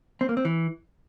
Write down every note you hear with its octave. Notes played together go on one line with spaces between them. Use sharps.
C4
A#3
C4
E3